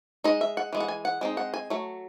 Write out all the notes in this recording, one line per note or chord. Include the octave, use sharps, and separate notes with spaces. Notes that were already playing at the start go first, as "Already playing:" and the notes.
G#3 D#4 D#5
E5
F#5
E3 G#3
F#5
G#5
F#5
G#3 C4 D#4
F#5
G#5
F#3 A3